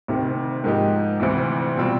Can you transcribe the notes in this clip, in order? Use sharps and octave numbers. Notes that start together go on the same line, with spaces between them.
D2 C3 D#3
G#2 F3 A#3 D#4 G4
D2 C3 E3
B2 G3 C4 F4